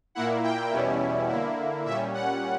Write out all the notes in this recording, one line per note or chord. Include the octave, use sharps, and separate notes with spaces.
A#2 A#3 E4 F#5
G5
E2 B2 G3 C#4 E4
D3 A#3 E4
A#2 G3 C#4 E5
F#5